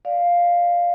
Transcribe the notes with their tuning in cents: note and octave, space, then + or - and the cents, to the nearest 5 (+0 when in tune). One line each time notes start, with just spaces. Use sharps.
D5 +0 F5 +0